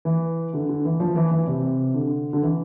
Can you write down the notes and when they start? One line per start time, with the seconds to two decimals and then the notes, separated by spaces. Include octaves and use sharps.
0.05 E3
0.54 D3
0.69 D3
0.85 E3
1.00 F3
1.16 E3
1.31 E3
1.47 C3
1.94 D3
2.33 D3
2.43 E3